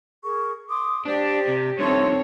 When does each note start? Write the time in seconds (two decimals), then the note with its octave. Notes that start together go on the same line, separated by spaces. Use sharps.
0.24 G#4 A#4 C#6
0.69 C6 D6 D#6
1.06 D4 G4 C5 D5
1.48 C3
1.79 G2 D#3 C4 A4 C#5 E5 C6